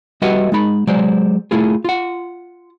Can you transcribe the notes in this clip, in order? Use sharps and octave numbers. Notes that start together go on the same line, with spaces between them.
G3 F#4 B4 D#5 E5 F#5
G#3 D#4 B5
F#3 G#3 C5 D5
A3 E4 F4 G#4
F4 F#5